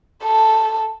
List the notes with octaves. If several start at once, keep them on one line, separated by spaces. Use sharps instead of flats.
A4